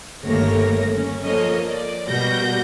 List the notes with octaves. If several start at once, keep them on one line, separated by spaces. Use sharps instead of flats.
G1 D#2 A3 A#3 C#5 A#6
C#4
F3 A#3 A4 C#5 D#5
D5
B2 G3 A#3 F#4 G6 A#6